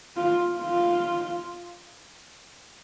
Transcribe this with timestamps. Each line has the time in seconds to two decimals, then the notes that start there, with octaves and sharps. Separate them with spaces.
0.16 F4
0.59 F4